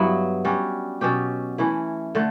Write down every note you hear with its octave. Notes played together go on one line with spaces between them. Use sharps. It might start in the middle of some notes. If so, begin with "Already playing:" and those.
Already playing: G2 F#3 B3 E4
G3 C#4 F#4
B2 F#3 C#4 G4
E3 A3 C#4 E4
D3 A3